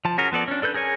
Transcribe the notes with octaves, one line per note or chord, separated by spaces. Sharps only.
F3 A5
C#4 F#4 G#4 A#4
F3 B3 A4 D5
C#4 D4
D4 A4 B4 G6
G#4 A#4 C#5 G#5